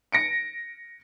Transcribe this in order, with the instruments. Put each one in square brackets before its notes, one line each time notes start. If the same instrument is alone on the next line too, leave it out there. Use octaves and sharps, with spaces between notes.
[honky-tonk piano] A#6 C#7 D7